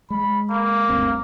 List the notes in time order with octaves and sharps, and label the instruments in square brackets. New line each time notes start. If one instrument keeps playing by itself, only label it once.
[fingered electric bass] G#3 [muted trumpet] B5
[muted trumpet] A#3
[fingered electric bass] G1 D2 C4